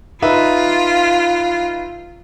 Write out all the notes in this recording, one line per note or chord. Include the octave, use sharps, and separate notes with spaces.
D#4 F4 B4 E5